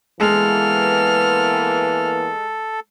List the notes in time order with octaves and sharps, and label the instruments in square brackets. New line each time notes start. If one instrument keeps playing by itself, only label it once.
[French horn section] E3 A#3 B3 [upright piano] G#3 [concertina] A4 [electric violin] F6